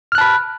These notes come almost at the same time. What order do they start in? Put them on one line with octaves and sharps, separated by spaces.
F6 F#6 A5 B5